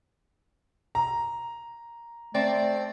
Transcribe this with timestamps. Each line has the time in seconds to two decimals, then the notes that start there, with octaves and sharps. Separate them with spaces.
0.95 A#5
2.35 A3 C4 D5